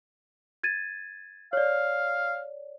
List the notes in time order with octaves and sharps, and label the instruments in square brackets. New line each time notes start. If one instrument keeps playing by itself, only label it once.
[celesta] G#6 A6 D#7
[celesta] C#5 D5 [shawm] F5